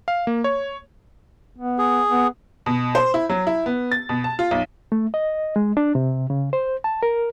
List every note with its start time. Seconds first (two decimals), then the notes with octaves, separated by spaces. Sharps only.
0.08 F5
0.27 A#3
0.44 C#5
1.58 B3
1.78 G#4
2.10 B3
2.66 B2
2.95 C5
3.14 E4
3.30 F#3
3.47 E4
3.66 B3
3.92 A6
4.09 B2
4.24 A5
4.39 F4
4.51 B1
4.92 A3
5.14 D#5
5.56 G#3
5.77 D4
5.95 C3
6.30 C#3
6.53 C5
6.84 A5
7.03 A#4